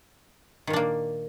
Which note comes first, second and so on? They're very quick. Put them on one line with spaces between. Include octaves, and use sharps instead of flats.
D#3 A#2 D4 A#3